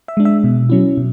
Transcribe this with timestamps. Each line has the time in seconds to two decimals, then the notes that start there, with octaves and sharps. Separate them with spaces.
0.08 E5
0.17 G#3 D4
0.25 E5
0.44 B2
0.70 F#3 C#4 E4
0.97 B2